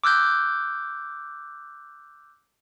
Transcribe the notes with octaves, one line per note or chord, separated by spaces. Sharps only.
D6 E6 F#6 G6